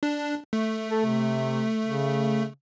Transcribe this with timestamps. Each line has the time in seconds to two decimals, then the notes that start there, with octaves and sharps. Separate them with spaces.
0.03 D4
0.53 A3
0.91 A4
1.06 C3
1.84 C#3